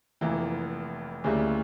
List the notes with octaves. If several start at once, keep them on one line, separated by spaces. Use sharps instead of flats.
F1 F2 E3 A#3
D2 C#3 G3 A#3 E4